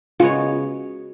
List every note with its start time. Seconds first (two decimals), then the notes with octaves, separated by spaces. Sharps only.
0.20 C#3 G#3 B3 F4 F#4 C#5